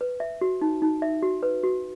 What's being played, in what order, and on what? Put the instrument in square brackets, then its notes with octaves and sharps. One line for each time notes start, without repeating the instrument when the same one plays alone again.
[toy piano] B4
E5
F#4
D#4
D#4
E5
F#4
B4
F#4